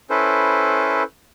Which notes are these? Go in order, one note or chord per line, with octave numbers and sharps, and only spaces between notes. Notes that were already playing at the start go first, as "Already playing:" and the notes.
C#4 E4 A4 B4 C5